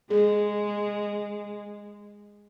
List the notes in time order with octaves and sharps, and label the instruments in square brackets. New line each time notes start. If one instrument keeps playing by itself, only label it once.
[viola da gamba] G#3 [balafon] G#4